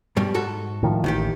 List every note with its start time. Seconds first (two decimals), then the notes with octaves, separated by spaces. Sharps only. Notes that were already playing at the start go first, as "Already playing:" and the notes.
0.17 G2 B2 G3
0.34 G#2 F#4 A4
0.83 A2 D#3 F3
1.04 A1 D#2 D#3 G4